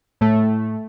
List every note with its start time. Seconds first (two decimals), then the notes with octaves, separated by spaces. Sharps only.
0.21 A2 A3